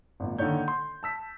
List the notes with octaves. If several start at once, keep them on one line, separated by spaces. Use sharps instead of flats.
G#1 A#2
D3 D#3 A#3 C#5 G6
C6
A5 E6 B6